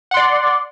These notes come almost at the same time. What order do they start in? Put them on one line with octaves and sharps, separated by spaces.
F#5 C6 D5